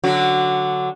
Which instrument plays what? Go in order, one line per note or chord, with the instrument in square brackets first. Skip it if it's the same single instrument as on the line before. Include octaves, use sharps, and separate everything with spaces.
[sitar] D3 F#3 F#4